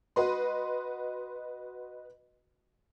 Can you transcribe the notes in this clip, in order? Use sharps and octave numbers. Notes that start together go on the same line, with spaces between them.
F#4 B4 D#5 C6